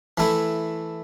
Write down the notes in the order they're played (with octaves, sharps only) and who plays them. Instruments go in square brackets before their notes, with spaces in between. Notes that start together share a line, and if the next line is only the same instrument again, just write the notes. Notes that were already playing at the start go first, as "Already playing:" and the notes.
[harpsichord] E3 A3 E4